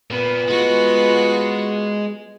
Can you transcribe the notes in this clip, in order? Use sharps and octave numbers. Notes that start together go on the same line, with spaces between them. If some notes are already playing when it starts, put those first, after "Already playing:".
A#2 B3
G#3 F4 F#4